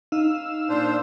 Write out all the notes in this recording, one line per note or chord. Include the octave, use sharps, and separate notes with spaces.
D#4 F5 E6
A#2 D4 C5